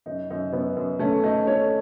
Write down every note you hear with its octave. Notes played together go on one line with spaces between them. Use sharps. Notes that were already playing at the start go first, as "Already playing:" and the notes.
F#2 D#4
F#2 D#4
F#2 B3
F#2
A3 C#4
A3 D#4
A3 C#5